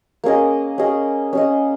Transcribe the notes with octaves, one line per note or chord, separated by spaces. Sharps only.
A#3 C#4 G#4 D#5
C#4 G#4 D#5
C#4 G#4 D#5